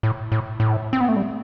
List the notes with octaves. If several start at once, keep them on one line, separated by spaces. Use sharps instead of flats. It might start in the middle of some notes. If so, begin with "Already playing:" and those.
A2
A2
A2
C4
B3
A3
G3